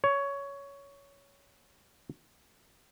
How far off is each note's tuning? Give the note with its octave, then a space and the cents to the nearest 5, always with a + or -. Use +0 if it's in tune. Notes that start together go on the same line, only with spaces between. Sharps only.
C#5 +15